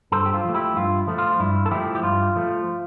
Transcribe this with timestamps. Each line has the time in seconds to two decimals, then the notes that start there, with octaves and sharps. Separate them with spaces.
0.12 G2 A4 C5
0.26 G4
0.34 F4
0.45 F3 A3
0.54 E4 G4
0.76 G2 F4
1.07 F3 A3
1.18 F4
1.40 G2 E4
1.66 A4
1.71 F3 A3 E4 G4
1.95 G4
2.03 G2 F4
2.36 F3 A3